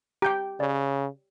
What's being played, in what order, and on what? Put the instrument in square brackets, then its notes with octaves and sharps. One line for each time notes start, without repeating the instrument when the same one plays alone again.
[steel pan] G4 G5 [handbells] A#5 G6
[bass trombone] C#3 [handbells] C#5 D5